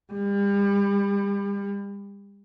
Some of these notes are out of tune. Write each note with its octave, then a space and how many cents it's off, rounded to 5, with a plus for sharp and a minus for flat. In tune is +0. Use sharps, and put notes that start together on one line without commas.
G3 +35